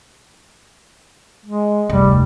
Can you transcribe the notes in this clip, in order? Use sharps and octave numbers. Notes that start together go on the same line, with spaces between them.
G#3
F1 D2 G3